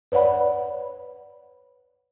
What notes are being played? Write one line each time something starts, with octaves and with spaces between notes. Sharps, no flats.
B4 C#5 D5 F#5 B5